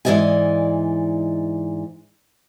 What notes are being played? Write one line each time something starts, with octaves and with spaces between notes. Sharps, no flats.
G#2 E3 F3 D5 D#5 G#5